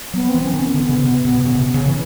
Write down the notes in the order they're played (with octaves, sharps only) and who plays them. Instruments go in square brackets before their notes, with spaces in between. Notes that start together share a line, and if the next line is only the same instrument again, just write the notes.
[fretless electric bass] F#3 [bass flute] B3
[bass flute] C4
[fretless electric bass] E3
[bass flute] C#4
[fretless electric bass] D#3
[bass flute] B3
[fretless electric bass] D3
C#3
C3
C3
B2
C#3
C3
C#3
E3